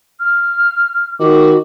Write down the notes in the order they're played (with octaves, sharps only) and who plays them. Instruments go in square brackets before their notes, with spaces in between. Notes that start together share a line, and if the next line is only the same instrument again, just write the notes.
[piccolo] F6
[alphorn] D#3 [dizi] F#4 [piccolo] D6